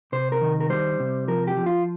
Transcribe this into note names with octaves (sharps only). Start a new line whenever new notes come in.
C3 C5
A#4
D#3
A#4
G3 C5
C3
F3 A#4
G4
F3
F4